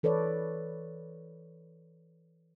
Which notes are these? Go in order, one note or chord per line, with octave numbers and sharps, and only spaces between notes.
E3 A4 B4 C#5 D5